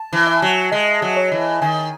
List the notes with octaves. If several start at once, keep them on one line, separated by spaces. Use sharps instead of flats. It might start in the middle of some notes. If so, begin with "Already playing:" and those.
Already playing: A5
E3
E5
F#3
G#3 D#5
F#3
C#5
E3
D#3 G#5